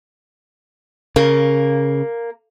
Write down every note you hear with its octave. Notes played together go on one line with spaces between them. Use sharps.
C#3 A#3